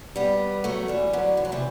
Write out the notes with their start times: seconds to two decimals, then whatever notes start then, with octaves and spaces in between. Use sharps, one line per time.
0.16 G3 B3
0.64 F#3 A3
0.88 E3 G3
1.13 D3 F#3
1.37 E3
1.45 F#3
1.52 C3 E3